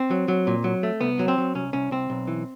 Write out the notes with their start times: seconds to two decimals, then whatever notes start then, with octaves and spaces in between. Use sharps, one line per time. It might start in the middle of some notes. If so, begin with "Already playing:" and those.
Already playing: C4
0.11 F#3
0.28 F#3
0.47 A#2
0.64 F#3
0.83 A3
1.01 C2 B3
1.19 F#3
1.28 C4
1.38 F#3
1.55 C2 C#4
1.73 C2 C#4
1.91 C2 C4
2.10 B1
2.28 E3